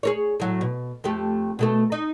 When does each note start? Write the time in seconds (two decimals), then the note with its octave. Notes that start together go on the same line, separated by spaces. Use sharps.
0.03 G#4 A#4 C#5
0.40 A2 F#3
0.61 B2
1.04 F2 A3 G4
1.59 B2 A3 A4
1.92 D#4